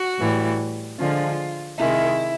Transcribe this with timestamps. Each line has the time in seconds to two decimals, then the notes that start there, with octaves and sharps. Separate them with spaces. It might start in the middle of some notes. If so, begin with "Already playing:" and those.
Already playing: F#4
0.18 A2 E3 G3
0.98 D3 F3 G#3 F4
1.78 C3 D#3 G#3 E4